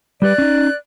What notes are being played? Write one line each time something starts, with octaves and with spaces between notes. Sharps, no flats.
G3 G4 B4 D5 F#6
C#4 D#4